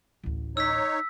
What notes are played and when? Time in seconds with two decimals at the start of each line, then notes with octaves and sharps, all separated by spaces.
0.24 A1 D2
0.57 D#4 C#5 E6 B6